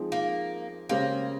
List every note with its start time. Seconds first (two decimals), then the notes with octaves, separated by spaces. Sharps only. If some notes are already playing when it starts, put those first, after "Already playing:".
Already playing: F3 G#3 C4 D#4 G#4
0.12 A#3
0.89 C#3 G#3 A#3 C#4 G4 C5